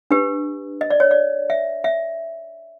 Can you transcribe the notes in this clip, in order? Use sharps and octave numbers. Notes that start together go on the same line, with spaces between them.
D4 G4 B4
D#5
D5
C#5
D5
E5
E5